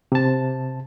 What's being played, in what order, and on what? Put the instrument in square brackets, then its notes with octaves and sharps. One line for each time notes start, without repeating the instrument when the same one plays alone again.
[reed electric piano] C3 A5